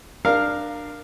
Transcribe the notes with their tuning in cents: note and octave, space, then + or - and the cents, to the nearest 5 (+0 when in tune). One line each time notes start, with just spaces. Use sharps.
D4 +20 A#4 +0 F5 +0